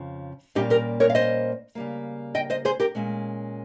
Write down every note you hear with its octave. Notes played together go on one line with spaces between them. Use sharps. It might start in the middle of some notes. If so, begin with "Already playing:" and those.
Already playing: F2 C#3 F3
A#2 G3 A#3 C#4 D#4 G4
G4 A#4
A#4 C#5
F5
C5 D#5
C#3 G3 A#3
D#5 G5
C5 D#5
G#4 C5
G4 A#4
A#2 G#3 C#4